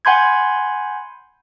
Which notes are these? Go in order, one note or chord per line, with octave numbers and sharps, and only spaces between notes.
F#5 G#5 B5 C6 G6 G#6